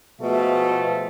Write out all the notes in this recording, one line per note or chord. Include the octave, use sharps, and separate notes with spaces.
B2 F3 G#3 A3